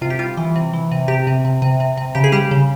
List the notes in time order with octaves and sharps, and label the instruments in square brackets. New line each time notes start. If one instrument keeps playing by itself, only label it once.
[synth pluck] C3 F4
G4
G3 F4
E3
C3
E3
C3
C3 G4
C3
C3
C3
C3
C3
C#3 G4
G#4
G3 G4
C#3